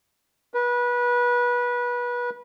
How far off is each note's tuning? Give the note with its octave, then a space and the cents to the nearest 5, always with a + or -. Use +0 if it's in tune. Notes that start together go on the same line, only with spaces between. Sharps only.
B4 -25